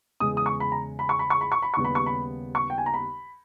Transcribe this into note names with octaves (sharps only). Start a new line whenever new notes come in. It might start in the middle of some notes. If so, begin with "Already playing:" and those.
E2 C#3 G#3 D#6
D#6
C#6
B5
A#5
B5
C#6
B5
C#6
B5
C#6
B5
D#2 C#3 G3 B3 C#6
B5
C#6
B5
C#6
G5
G#5
A#5
B5